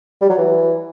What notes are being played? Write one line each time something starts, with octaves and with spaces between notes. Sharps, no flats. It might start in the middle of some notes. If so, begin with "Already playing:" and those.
G3
F#3
E3